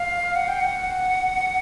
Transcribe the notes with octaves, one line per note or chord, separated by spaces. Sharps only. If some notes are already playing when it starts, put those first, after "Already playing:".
Already playing: F5
F#5
G5
F#5